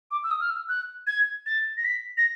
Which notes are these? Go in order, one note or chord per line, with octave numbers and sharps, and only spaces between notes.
D6
E6
D#6
F6
E6
F#6
G#6
A6
A#6
B6
A#6